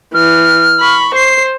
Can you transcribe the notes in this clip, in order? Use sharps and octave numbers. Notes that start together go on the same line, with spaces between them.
E3 F6
B5 C#6
C5 C7